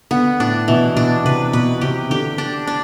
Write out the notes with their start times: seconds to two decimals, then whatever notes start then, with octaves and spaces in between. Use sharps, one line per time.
0.11 D3 B3
0.39 A2 D4
0.68 B2 E3
0.96 B2 D4
1.25 C3 B4
1.53 B2 B4
1.81 C3 G4
2.10 D3 G4
2.38 D4
2.67 D4